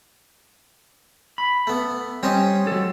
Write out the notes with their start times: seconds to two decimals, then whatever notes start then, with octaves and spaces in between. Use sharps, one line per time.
1.38 B5
1.67 A3 B3
2.23 G3 C4 C#4 D#5
2.67 F#3 A4